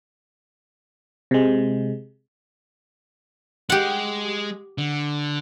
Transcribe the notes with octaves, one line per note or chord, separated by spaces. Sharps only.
C3 G#3
G#3 G4 F#5
D3